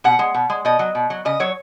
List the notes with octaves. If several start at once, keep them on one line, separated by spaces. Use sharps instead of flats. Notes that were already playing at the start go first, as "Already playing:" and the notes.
B2 F#5
G#3
B2
G#3
B2 D#5
F#3
B2
F#3
C#3 D#5
F#3 C#5